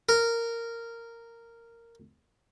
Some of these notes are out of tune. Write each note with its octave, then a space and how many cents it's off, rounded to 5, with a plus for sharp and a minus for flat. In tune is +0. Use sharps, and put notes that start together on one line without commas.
A#4 -10